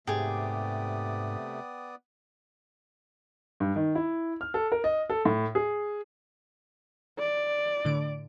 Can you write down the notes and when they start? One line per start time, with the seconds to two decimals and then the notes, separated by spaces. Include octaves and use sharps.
0.07 G#2 C3 A3 B3 G4 G#4 D5 D#6
3.60 G2
3.76 D#3
3.95 E4
4.41 F6
4.54 A4
4.72 A#4
4.84 D#5
5.10 A4
5.25 A2
5.55 G#4
7.19 D5
7.85 A2 D3 D7